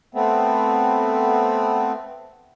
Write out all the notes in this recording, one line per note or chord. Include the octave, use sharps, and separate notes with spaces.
A3 B3 C4